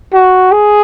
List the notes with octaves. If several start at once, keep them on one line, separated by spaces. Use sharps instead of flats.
F#4
G#4